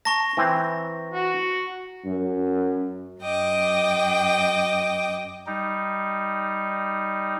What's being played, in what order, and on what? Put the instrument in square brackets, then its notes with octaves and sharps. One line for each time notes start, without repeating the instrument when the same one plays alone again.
[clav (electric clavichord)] A5 [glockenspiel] A#5 C#6 A#6
[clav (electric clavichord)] E3 C4
[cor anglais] F#4
[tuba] F#2
[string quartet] F#2 D#5 G5 D6
[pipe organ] G3 D#4